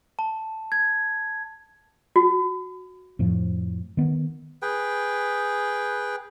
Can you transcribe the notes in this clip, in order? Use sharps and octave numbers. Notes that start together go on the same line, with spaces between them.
A5
G#6
F#4
F2 A2 F3
D#3 B3
G#4 B4 G5